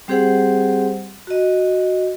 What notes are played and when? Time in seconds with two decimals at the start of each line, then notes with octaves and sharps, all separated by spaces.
0.08 G3 C4 G4 G#4 C5 F#5
1.27 F#4 D#5